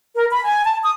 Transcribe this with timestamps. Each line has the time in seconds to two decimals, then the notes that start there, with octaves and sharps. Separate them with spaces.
0.14 A#4
0.31 B5
0.44 G#5
0.64 A5
0.83 D#6